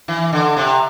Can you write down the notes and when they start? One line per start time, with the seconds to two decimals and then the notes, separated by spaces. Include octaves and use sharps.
0.08 E3
0.33 D3
0.57 C3